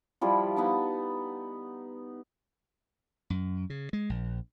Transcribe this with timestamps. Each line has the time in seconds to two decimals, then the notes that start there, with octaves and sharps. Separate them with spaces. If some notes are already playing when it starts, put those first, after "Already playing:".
0.21 F3 G3 E4 F4
0.56 B3 D#4 F#5 A5
3.30 F#2
3.70 C#3
3.93 G#3
4.09 A#1